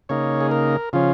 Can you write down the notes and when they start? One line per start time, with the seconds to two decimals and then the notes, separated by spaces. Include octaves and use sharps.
0.09 C#3 A#3 D#4 C#5
0.41 G#4
0.51 A#4
0.93 C#3 F3 C#4 F4